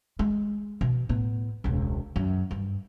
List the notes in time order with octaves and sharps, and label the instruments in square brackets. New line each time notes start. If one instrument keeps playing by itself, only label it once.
[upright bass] G#3
B2
A2 B3
E1 C#2
F#2
G2